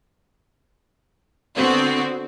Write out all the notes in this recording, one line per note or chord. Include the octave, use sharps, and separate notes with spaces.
D3 B3 C4 F#4